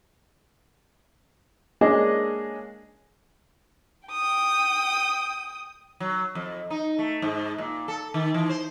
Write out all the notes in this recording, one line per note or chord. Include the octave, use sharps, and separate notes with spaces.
G#3 A#3 C#4 D4 G#4 D#5
G5 D#6
F#3
F2
D#4
A3
G#2
A#2
A4
D#3
E3
C5